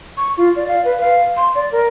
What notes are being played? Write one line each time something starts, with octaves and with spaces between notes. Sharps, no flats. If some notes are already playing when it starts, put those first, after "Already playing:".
C#6
F4
D5
F5
B4
F5
C6
D5
A#4